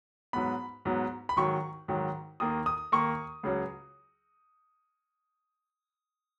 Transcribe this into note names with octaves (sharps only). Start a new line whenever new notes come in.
G#2 F#3 B3 B5
G#2 F#3 B3
B5
G#2 D#3 F#3 C#6
G#2 D#3 F#3
D#2 D#3 A#3 D#6
D#6
D#2 D#3 A#3 C#6
C#2 C#3 F#3